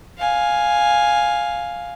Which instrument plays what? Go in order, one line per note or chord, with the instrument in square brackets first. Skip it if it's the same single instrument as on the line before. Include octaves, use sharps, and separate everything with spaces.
[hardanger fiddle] F5 G#5